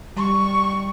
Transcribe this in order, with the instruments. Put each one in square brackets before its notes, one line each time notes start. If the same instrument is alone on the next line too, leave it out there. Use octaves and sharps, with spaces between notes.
[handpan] G3 [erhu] C#6